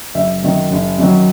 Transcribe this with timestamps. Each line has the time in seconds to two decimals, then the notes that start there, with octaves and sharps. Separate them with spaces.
0.15 F#1 E5
0.43 F#2 D#3 F#3
0.71 F#1
0.99 F#2 D#3 F#3